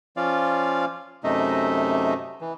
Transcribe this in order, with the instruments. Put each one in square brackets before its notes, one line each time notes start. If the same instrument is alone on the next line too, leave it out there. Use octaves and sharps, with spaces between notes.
[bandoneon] F3 C#4 F4 D5 F5
F#2 C3 A3 D#4 D#5 E5
E3